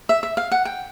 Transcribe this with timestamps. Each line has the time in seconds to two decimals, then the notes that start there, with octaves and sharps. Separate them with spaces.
0.09 E5
0.23 E5
0.37 F5
0.51 F#5
0.65 G5